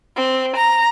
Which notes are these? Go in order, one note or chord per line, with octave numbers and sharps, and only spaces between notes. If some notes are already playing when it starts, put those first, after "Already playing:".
C4
A#5